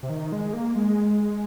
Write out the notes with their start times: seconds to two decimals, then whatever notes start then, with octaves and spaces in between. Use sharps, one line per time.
0.03 C3
0.09 D#3
0.32 G#3
0.53 A#3
0.76 G#3